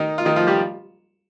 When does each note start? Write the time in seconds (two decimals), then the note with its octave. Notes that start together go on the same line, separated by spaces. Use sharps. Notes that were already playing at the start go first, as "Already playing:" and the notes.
Already playing: D#3 D#4
0.18 F4
0.25 D#3 D#4
0.36 F3 F4
0.47 G3 G4